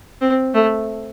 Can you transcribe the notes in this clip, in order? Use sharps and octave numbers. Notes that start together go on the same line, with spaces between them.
C4
A3